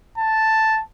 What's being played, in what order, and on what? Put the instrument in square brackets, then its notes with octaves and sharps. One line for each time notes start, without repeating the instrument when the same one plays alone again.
[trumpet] A5